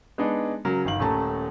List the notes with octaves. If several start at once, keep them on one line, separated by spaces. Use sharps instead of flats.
G#3 B3 D4 D#4
C#3 F#3 A#4
G1 D#3 F5 F#7
D#1 A3 C#4 A5 A#5